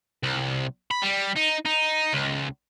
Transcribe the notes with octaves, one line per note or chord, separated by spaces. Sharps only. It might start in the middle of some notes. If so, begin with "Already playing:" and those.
C2
B5
G3
D#4
D#4
C#2